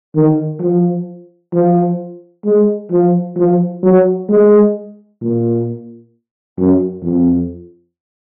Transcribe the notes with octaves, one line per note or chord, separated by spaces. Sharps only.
D#3
F3
F3
G#3
F3
F3
F#3
G#3
A#2
F#2
F2